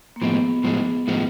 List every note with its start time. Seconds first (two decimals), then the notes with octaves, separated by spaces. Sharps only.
0.16 A#3
0.22 A2 F3 G#3 B3
0.64 A2 F3 G#3
1.08 A2 F3 G#3